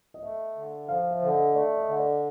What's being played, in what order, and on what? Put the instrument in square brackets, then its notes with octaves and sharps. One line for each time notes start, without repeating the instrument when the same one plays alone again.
[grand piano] D#5
[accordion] A3 [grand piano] E5
[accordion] D3
[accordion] F3 [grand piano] F5
[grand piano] E5
[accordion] D3
[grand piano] D#5
[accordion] A3 [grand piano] D5
[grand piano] D#5
[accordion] D3
[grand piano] D5